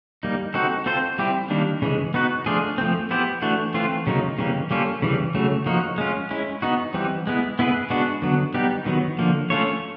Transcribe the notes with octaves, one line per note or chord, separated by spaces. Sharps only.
G3 A#3 D#4
C4 D#4 F#4 A4
C4 F4 A4 C5
G3 C4 E4 G4
D#3 G3 A#3 D4
C#3 E3 G#3
B3 D#4 F#4 B4
F3 A3 D4 F4 G#4
F3 A3 C4
B3 E4 G4 C5
E3 A3 D4 F#4
E3 A3 C4 F4
C#3 F#3 A#3 D#4
C#3 E3 G3 A#3
G3 A#3 C#4 F4 A4
C#3 E3 G3
C#3 F#3 A3
F3 A#3 D#4 F#4
G#3 C#4 F4
G#3 C#4 E4
B3 D#4 F#4
E3 G3 C4
G#3 B3 E4
B3 E4 G#4 B4
G#3 B3 D4 F#4
D3 F#3 B3
G3 B3 D#4 G4
D#3 F#3 B3
D3 F3 A#3
A3 C#4 F4 A4 C#5